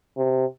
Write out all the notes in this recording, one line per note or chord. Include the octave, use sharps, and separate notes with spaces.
C3